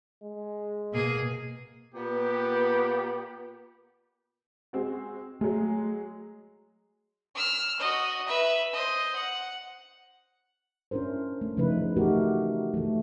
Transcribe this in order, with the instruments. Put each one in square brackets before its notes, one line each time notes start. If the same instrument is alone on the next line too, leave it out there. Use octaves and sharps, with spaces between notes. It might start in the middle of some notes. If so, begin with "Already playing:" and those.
[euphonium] G#3
[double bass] B2 [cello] A#3 G#4
[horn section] A#2 B3 G4
[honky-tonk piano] G#3 C4 F#4
[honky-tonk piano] F#3 G#3 [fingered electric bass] A3
[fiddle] E6 F6
F#4 D#5
B4 E5
C5 D#5
F#5
[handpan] C#4 D4 E4 A#4 C5
A3
C#3 F3 C#4 D#4 E4 B4
E3
A3 D#4 F#4 G4 A#4
E3 A3